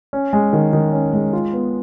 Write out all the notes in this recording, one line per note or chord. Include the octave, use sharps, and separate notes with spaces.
C#4
G#3
D#3
D#3
C#4
G#3
F4
B3